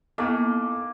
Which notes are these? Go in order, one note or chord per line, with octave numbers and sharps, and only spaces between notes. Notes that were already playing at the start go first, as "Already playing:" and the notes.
A#3 B3 D#4 E4 A4